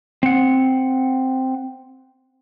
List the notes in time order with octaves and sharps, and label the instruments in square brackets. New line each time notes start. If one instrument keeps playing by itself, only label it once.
[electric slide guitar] C4 F#5